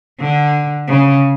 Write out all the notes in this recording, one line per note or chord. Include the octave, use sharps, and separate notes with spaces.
D3
C#3